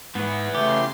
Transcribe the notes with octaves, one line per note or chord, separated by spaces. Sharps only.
G#2 E3 B3
C#3 A3 G4 C6